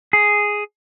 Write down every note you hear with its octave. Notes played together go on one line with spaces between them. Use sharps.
G#4